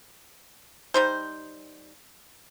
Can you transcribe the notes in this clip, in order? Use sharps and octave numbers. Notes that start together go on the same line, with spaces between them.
G3 D#4 C5